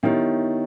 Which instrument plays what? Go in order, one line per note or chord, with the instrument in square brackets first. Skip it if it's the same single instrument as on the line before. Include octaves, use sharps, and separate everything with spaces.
[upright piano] D#3 [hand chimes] B3 E4 G4 C#5 E5